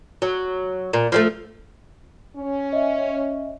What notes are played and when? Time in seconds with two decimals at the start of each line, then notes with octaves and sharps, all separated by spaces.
0.22 F#3
0.93 A#2
1.12 F3 G3 A3
2.36 C#4
2.73 D#5 E5